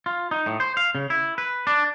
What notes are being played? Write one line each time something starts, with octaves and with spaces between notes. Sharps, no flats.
F4
D#4
A2
C5
F5
C#3
E4
B4
D4